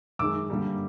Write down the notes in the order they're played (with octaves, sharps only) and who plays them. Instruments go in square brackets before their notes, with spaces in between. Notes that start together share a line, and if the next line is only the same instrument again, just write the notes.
[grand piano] F#2 D#3 G#3 D6 E6
G2 D3 G3 A#3